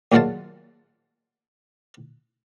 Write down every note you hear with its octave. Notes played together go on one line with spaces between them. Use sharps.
D#2 A#2 F#3 G#3 F5 A5